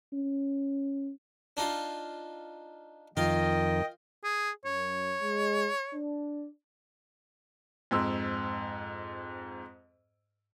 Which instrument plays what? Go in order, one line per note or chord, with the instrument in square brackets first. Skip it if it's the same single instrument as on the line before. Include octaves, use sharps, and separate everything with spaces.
[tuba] C#4
[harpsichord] D4 D#4 F4
[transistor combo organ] F2 [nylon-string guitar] D#3 [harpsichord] F4 [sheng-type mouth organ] D#5 G5
[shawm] G#4
[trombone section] F#2 [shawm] C#5
[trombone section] G#3
D4
[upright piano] F2 G#2 E6